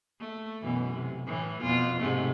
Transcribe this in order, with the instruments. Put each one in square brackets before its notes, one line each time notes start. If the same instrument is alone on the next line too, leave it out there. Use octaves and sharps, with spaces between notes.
[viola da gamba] A3
F#2 B2 E3
C3
A2 E3
F2 B2 F4
G#2 C3 A3